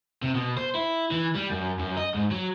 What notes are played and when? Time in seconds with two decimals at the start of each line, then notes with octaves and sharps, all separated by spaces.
0.22 C3
0.35 B2
0.57 C5
0.75 E4
1.11 E3
1.35 G3
1.50 F#2
1.79 F#2
1.97 D#5
2.14 G#2
2.31 F#3